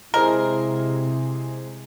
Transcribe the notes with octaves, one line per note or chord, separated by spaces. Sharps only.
C3 G#3 E4 G#4 A#4 C5 D#5